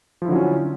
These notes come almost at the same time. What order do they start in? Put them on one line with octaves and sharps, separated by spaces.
F3 E4 D3 F#3 C#4